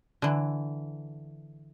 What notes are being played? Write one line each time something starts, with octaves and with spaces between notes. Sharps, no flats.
D3 E3